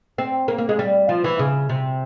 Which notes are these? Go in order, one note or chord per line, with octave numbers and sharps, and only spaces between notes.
C4
A#3
A#3
G#3
G3
F3
E3
C#3
C3